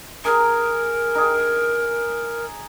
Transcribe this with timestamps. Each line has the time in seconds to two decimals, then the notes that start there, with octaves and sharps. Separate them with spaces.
0.25 G#4 A#4 A#5
1.15 D#4 G#4